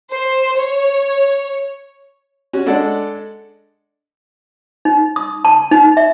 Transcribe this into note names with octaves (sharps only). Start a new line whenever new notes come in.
C5
C#5
C#4 F#4
G#3 D4 A4 D5 F#5
D#4
D#6
A5
D#4
E5